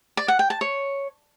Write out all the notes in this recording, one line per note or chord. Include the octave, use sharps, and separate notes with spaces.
D5
F#5
G5
A5
C#5